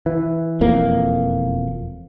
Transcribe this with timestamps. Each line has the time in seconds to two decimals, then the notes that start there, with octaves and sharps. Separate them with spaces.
0.06 E3
0.61 E1 F2 A#3